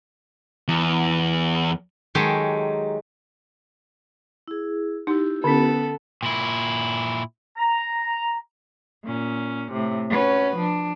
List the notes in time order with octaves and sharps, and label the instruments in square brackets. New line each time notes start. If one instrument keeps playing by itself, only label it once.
[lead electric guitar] E2
[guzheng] D#3 F#3 G#3 G4 A4
[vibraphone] E4 G#4
[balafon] D#4 [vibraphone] E4 G4
[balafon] D3 C#4 [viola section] B3 [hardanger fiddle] A4
[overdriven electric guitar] A#2 E4
[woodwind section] A#5
[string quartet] A#2 C#4
A2 C3
C#4 F#4 B4
F3 D4